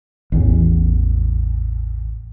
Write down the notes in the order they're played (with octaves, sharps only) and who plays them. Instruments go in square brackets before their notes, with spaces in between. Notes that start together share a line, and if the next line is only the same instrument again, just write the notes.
[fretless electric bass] A1 E2